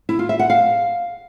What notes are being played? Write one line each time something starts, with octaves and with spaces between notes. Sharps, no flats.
E4
F4
E5
F#5
F5